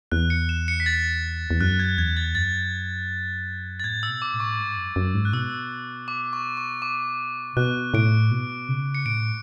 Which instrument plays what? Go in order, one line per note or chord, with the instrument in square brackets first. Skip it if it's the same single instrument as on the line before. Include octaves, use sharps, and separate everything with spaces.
[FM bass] E2 [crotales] F#6
[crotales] C#7
E7
C#7
B6
A6
[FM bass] E2
[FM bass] F#2 [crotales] F#6
[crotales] G#6
[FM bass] E2 [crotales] G#6
[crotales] A6
[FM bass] F#2 [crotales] A6
[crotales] A6
[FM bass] A2 [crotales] G#6
[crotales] E6
[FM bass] B2
[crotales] D6
[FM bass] A2
[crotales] C#6
[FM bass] G#2
F#2
F#2
G#2
[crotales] F#6
[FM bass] B2 [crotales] E6
[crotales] D6
C#6
C#6
D6
[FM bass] B2 [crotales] F#6
[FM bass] A2 [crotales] D7
[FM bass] B2
C#3
[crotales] C#7
[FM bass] A2 [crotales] D7